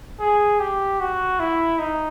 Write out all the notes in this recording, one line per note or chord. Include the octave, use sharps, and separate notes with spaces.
G#4
G4
F#4
E4
D#4